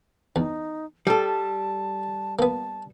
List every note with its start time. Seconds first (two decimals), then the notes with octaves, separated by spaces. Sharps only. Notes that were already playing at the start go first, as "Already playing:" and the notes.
0.36 E2 D#4
1.07 G3 A4 A5
2.39 A#3 B3 A5